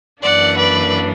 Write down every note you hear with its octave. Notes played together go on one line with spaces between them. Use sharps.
F#2 E3 A#3 D4 D5 F#5
B4 D5